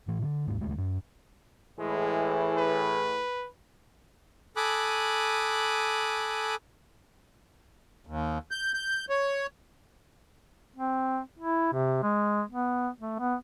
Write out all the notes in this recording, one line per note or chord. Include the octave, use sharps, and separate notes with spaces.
A2 E3
D3
G1 D#2 G#2 G#3
D#1 D2 G#3 A3
F#2
A2 E3 G#3 G#4
B4
A4 G#5 B5 D6 D#6 F#6
D#2
G6
G6
C#5
C4
E4
C3
G#3
B3
A3
B3